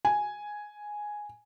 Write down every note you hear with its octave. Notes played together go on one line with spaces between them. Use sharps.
G#5